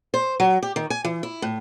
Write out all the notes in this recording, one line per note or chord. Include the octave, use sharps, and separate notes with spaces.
C5
F#3
G4
D#3
G#5
E3
E4
A2